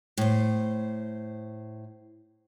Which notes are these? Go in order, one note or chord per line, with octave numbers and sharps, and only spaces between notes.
A2 C5